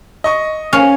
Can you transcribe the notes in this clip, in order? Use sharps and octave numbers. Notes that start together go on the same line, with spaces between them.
D#5 C#6 D#6
C#4 F5 F6